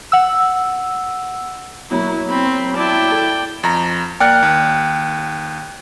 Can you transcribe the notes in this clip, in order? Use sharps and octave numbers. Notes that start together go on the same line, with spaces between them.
F#5 E6
B2 F#3 A#3 E4
C4 B5
E4 D5 G5 A5
A4
F2 A#5
A#3 D5 G5 F6 F#6
D#2